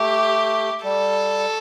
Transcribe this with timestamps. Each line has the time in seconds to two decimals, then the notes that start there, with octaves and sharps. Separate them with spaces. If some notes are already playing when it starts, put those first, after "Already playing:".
Already playing: A3 G4
0.84 G3 A4